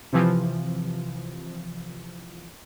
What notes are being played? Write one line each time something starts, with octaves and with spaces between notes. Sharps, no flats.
C3 E3 F3